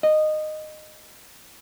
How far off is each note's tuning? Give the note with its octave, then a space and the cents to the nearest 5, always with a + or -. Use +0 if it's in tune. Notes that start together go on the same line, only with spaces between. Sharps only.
D#5 -15